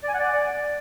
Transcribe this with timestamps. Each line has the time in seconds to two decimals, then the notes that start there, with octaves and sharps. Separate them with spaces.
0.03 D5
0.08 G#5
0.14 F#5
0.19 D5